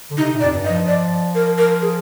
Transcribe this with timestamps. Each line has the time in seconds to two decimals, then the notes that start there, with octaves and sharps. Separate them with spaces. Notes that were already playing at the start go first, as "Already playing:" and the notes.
0.11 D3
0.18 C3 D#4
0.34 A#2
0.41 D5
0.43 F2
0.53 G2
0.65 D#5
0.70 F3
0.87 D5
1.35 A#4
1.58 A#4
1.82 G#4